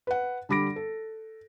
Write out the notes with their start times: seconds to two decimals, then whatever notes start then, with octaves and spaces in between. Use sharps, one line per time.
0.07 B4 F#5
0.49 D3 G3 B5 D6 A#6 D7
0.76 A4